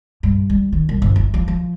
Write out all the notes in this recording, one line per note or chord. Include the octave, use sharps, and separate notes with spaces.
G2
G3
D#3
C2
G1
E3
F3
F3